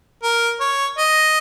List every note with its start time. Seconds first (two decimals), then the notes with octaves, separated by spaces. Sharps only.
0.23 A#4
0.60 C#5
0.98 D#5